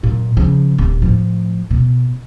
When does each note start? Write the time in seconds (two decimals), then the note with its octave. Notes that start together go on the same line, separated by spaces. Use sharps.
0.03 F#2 A#2
0.37 C#3 F3
0.78 D#1 A#2
1.02 A2 F3
1.71 B2